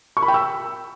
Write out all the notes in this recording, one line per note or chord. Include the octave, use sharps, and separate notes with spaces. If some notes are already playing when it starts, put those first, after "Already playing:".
C#6
B5
G5
E6